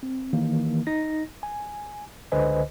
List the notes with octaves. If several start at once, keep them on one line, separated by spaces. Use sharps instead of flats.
C4
D#3 E3 A#3
D#4 A#6
G#5
C#2 D3 B4 C5 D#5 G#5